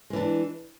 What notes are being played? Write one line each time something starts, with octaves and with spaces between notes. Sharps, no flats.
E3 G#3 D4